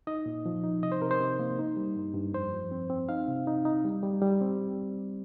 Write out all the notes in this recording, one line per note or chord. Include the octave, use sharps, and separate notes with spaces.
D#4 D#5
A#2
F3
D#4
C3 D#5
C5
C3 A#4
C5
C3
A#3
D#4
G3
G2
G2
F2 C5
F3
C4
C4
D#4 F5
C3
D#4
D#4
G3
G3
G3
C4